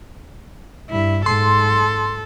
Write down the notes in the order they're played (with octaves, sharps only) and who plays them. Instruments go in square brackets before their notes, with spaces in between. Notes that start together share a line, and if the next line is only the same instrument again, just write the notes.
[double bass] G2 [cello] E4
[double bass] G#2 [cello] A4 [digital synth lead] C6